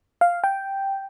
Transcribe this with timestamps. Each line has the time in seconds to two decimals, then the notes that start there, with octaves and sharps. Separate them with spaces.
0.21 F5
0.44 G5